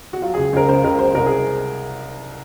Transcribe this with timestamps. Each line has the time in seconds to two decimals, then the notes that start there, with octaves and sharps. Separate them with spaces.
0.13 F#4
0.22 F#3 F4
0.34 G#4
0.37 C#2
0.53 C#2 A#4
0.68 C#3 C5
0.84 C#2 A#4
0.99 F#3 C5
1.15 C2 A#4
1.26 G#4